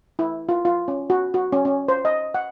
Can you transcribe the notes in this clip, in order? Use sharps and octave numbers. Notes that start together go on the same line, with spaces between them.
E4
F4
F4
C#4
F#4
F#4
C#4
C#4
C5
D#5
F#5